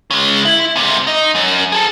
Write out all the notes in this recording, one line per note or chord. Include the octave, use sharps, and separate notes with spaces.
C#3 G#3
E4
G#2 C3
D#4
F#2
G#4 A4